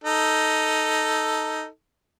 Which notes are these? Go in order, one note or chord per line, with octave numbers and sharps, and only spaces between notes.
D#4 A4